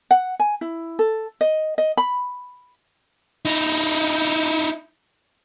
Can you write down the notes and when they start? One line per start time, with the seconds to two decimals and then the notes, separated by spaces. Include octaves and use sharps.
0.11 F#5
0.39 G#5
0.61 E4
0.99 A4
1.41 D#5
1.78 D#5
1.97 B5
3.45 D#4 E4